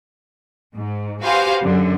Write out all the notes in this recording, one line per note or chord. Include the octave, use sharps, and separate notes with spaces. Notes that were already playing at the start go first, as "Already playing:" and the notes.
G#2
F#4 G4 B4 C5 F5 G#5
F#2 D3